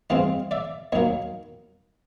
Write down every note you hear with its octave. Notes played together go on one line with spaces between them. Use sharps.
G2 E3 G#3 C4 D#5 F5
D5 E5
D#2 D#3 F#3 A#3 C#5 D#5